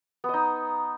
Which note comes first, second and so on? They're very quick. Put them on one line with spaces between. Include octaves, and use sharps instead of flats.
B3 D#5 D#4